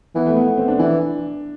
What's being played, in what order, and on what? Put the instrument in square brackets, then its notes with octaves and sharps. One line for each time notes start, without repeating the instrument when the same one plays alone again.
[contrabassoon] E3 [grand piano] B3
[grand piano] A3
B3
B3
C4
D4
[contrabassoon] E3 [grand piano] D4